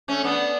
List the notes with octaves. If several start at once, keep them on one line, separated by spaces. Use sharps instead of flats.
A3 C#4
B3 D4